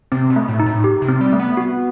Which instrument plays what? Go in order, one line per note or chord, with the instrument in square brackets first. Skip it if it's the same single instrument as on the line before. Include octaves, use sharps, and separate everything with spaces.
[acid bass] C3 [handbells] C4
[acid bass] B2
[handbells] A3
[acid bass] A2
[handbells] D#4
[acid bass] A2
[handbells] G4
[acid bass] C3
[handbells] C4
[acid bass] G3
[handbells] A3
[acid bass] B3
[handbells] F#4